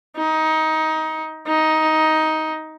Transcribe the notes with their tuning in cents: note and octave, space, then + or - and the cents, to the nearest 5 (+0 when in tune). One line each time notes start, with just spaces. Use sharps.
D#4 +20
D#4 +15